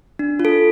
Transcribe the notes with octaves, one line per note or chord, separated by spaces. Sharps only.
D4
F4
A4